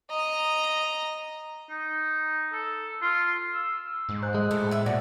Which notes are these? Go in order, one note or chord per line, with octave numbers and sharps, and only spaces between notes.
D#5 A#5
D#4
A4
F4
E6
G#2
C5 F#6
G#3
A2 A4
E4 E5
A#2 F#4 D5